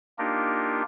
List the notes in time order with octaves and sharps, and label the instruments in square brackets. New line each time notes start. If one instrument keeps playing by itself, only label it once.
[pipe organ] A#3 D4 D#4 F4 G4 A#4